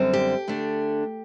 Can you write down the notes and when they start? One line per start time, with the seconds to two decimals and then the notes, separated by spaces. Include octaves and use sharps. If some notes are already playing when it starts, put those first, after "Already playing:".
Already playing: F#2 D3 G3 C4
0.13 G4
0.48 D3 A3 D4